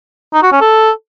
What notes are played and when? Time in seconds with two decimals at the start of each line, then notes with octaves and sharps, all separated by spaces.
0.34 D#4
0.43 F#4
0.52 C#4
0.61 A4